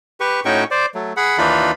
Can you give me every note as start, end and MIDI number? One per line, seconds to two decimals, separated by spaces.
0.20 0.40 67
0.20 0.40 71
0.20 0.40 85
0.45 0.64 45
0.45 0.64 61
0.45 0.64 63
0.45 0.64 66
0.45 0.64 79
0.45 0.64 85
0.71 0.86 72
0.71 0.86 74
0.95 1.13 54
0.95 1.13 57
1.17 1.38 68
1.17 1.38 78
1.17 1.38 83
1.38 1.71 39
1.38 1.71 52
1.38 1.71 62
1.38 1.71 63
1.38 1.71 65
1.38 1.71 83